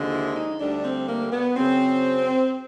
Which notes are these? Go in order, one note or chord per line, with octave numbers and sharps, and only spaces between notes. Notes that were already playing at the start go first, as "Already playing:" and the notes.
Already playing: D#2 D3 F3 G#3
E4
D#4
D2 D3 G3 D4
C4
A#3
B3
F#2 C#3 F#3 C4